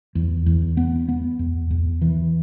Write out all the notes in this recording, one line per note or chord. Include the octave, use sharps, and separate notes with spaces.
E2
E2
B3
B3
E2
E2
E3